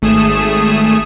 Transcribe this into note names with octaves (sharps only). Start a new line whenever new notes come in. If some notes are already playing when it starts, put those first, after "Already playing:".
G#1 A3 G#4 D#6 E7